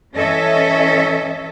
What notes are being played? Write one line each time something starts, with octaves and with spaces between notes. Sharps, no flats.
E3 C#4 A4 D#5 E5